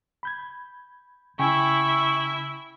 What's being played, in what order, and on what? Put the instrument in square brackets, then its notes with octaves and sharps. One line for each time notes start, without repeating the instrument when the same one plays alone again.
[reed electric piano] B5 G6 G#6
[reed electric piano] C#3 G5 G#5 [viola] E4 E5 [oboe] C#6